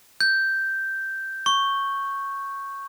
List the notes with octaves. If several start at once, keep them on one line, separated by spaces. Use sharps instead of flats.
G6
C#6